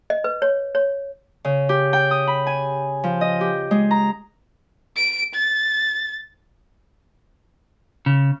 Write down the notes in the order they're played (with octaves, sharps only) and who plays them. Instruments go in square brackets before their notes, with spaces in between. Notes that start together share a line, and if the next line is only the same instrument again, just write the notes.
[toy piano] D#5
B4
C#5
C#5
[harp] C#3
G4
G5
D#6
B5
G#5
F3
D#5
G4
G#3
A#5
[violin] D7
A6
[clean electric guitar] C#3